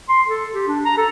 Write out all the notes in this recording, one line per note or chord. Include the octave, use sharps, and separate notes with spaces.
C6
A4
G4
D4
A#5
A4